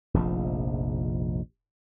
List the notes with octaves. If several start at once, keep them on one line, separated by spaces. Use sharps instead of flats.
F1 A#1 G#2 F3